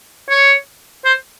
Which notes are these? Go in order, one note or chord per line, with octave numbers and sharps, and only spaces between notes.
C#5
C5